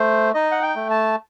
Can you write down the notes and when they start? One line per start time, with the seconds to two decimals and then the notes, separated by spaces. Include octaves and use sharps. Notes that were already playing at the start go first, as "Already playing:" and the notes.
Already playing: A3 C5
0.34 D#4 D#5
0.51 F#5
0.62 G5
0.76 A3
0.90 A5